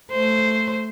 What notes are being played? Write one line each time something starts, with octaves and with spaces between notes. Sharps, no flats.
A3 C5